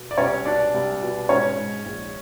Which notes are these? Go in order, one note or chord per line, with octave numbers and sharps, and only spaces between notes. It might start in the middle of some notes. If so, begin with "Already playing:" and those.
Already playing: B2
D5
C2 C#4 C#5
B2 D4 D5
C2
B2
G#2 C#4 C#5
G#2
A#1